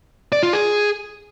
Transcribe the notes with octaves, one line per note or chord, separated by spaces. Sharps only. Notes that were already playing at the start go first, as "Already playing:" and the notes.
D5
F4
G#4